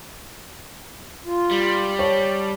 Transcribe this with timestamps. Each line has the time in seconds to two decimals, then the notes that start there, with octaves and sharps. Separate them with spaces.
1.26 F4
1.51 G3
1.99 C#5 A5